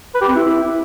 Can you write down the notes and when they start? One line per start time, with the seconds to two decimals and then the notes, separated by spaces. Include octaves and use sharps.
0.14 B4
0.21 G4
0.29 C4
0.36 E4